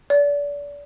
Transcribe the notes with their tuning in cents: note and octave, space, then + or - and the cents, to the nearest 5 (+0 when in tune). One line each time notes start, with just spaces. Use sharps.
D5 -30